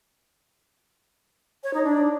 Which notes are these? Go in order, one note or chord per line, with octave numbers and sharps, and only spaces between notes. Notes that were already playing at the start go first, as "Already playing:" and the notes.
C#5
D#4
D4